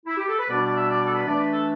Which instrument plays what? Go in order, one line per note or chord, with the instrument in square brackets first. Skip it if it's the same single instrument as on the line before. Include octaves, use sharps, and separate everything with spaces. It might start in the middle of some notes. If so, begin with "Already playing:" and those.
[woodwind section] E4
G4
A4
B4
B2 G3 B3 D4 D5
D5
E5
D5
D5
A4
B4
E3 A3 D4 D5
B4
A4